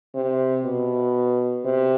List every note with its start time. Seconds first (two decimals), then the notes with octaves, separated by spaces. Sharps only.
0.15 C3
0.65 B2
1.65 C3